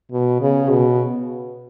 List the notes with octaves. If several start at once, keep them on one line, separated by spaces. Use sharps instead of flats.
B2
C#3
B2